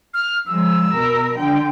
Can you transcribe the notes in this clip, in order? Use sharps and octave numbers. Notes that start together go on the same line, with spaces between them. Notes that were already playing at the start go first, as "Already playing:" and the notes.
F6
F3 G#3 E6
B2 A#4
D3 G5